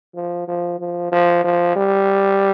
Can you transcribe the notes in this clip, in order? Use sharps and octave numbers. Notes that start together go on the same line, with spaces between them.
F3
F3
F3
F3
F3
G3